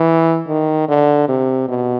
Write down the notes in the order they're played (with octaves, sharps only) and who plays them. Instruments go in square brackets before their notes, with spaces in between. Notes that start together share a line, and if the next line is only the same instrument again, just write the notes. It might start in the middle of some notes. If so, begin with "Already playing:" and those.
Already playing: [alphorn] E3
D#3
D3
C3
B2